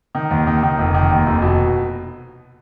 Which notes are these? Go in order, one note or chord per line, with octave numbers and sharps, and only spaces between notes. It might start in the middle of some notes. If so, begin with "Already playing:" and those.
D#3
D#2
D#3
D#3
F1
D#3
D#2
F1
B2